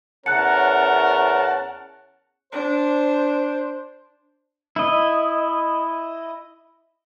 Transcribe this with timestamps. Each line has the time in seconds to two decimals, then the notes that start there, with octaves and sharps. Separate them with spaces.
0.26 E2 C#4 A#4 F#5 A5 F#6 C#7
2.52 D4 C5
4.76 E4 D#5